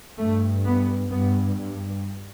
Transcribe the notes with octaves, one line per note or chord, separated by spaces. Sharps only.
G2 A3
B3
G2 B3